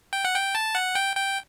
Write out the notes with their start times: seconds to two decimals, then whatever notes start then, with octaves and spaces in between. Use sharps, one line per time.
0.13 G5
0.25 F#5
0.35 G5
0.55 A5
0.75 F#5
0.95 G5
1.16 G5